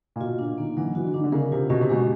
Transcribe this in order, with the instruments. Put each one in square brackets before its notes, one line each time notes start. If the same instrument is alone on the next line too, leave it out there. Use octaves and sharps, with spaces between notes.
[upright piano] A#2
[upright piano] B2 [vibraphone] F4
[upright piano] A#2 [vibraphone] D4
[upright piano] D#3 [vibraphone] A#3
[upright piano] E3 [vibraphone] F#3
[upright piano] E3 [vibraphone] F#4
[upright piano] D3
[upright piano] D#3 [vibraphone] D4
[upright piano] D3
[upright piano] C#3 [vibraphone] A#4
[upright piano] C3 [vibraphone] F4
[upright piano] B2 [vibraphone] C#4
[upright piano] C3
[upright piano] B2 [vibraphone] G#3